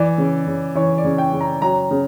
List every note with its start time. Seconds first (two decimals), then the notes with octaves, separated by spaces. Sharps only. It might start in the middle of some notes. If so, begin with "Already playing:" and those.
Already playing: E3 D5
0.18 C#3
0.47 C#3
0.75 E3 C#5
0.98 D5
1.04 C#3
1.18 G5
1.33 C#3
1.40 A#5
1.62 F#3 A#5
1.91 C#3